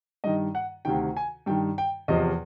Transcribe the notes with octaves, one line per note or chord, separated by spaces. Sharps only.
G2 D#3 D#5
F#5
D2 C3 D#3 G5
G#5
G2 D#3 G5
G5
E2 C3 F3 D#5